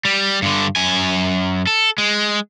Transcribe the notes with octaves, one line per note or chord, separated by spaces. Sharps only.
G3
G2 D3
F#2 G#5
A4
G#3